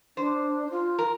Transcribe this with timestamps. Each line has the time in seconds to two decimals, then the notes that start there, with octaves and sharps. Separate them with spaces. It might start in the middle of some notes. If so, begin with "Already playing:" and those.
0.17 D4 C5
0.71 F4
0.98 A#4